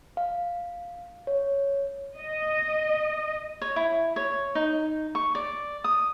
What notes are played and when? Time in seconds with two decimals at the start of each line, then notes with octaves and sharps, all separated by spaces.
0.17 F5
1.27 C#5
2.18 D#5
3.62 C#5
3.76 E4
4.16 C#5
4.55 D#4
5.15 C#6
5.35 D5
5.84 D#6